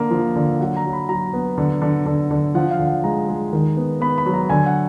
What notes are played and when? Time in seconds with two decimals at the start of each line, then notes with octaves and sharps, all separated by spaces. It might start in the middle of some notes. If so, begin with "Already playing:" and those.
Already playing: D3 A#3
0.11 F3
0.36 D3
0.60 F#3 F#5
0.76 A#5
0.85 F#3
0.93 B5
1.09 F#3 A#5
1.33 B3
1.58 D3
1.82 D3
2.06 D3
2.31 D3
2.55 F3 F#5
2.71 F5
2.79 D3
2.87 F#5
3.04 G#3 A#5
3.28 G#3
3.53 D#3
3.77 B3
4.01 B3 B5
4.18 B5
4.26 F#3
4.34 A#5
4.50 D3 G#5
4.66 F#5